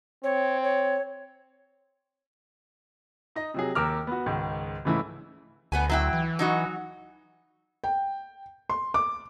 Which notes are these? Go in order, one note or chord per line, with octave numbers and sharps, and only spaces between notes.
C4 C#5
C#5
D#4 D#5
C3 F#3 G#4
D#2 A#4 D6 E6 F6
B3 F#4
C#2 G#2 D#3
G#2 C#3 E3 A3 E4
D2 B3 B4 G#5
F#3 E4 G5
E3
F#3 D#4 F#4
G5
C6
D6